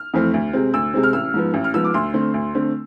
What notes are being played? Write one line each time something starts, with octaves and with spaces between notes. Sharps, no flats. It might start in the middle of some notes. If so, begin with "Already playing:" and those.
Already playing: F6
F2 E3 A3 C4
D2
C3 G#3 C4
D2 E6
C3 G#3 C4
F6
A1 E6
G#2 F3 B3
A1
F6
G#2 F3 B3 E6
D6
D2 C6
D3 A3 C4
D2
D3 A3 C4